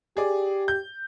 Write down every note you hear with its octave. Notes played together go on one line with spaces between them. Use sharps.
G4 G#4 D5
G6